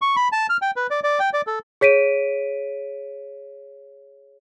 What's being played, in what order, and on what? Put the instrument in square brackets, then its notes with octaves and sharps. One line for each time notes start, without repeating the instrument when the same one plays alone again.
[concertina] C#6
B5
A5
F6
G5
B4
D5
D5
G5
D5
A4
[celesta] G#4 C#5 B6 D7 D#7